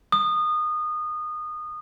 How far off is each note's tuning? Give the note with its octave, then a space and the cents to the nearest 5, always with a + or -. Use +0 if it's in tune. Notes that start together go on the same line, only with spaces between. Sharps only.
D#6 -25